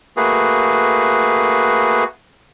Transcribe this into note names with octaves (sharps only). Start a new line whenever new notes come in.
A3 A#3 F#4 G#4 B4